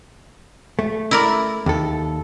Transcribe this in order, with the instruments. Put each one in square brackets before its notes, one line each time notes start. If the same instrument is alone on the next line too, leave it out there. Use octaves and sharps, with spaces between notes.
[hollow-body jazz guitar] A3
[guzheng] E4 A#4 D5
[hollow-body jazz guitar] D#2 A4